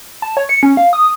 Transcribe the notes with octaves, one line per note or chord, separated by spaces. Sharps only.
A5
C#5
C#7
C#4
F5
D#6